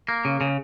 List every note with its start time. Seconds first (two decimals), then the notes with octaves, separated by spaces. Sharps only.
0.09 A#3
0.25 C#3
0.41 C#3